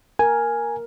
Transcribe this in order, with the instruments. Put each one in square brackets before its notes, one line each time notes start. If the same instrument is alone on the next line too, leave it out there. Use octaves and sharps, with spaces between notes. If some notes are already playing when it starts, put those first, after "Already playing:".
[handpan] A#4 [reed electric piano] G#5